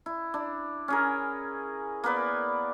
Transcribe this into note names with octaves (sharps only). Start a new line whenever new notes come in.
E4
D4
C#4 G#4 A#4
A#3 B3 B4 D5